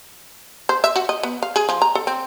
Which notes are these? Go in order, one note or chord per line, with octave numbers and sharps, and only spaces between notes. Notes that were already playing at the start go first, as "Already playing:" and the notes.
C5
E5
F#4
D#5
B3
F5
G#4
F3
A#5
A4
C4